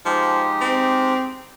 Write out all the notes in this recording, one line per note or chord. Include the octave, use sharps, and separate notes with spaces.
F3 G#3 D#4 G4
C4